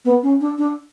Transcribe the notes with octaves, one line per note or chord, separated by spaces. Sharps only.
B3
C#4
D4
D4